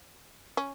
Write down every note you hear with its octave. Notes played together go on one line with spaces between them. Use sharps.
C#4